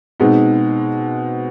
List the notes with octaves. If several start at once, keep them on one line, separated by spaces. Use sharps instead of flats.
B2 G#3 C4 D#4